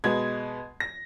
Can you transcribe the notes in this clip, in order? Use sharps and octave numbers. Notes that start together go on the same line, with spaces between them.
B2 G#3 B3 G#6
A#6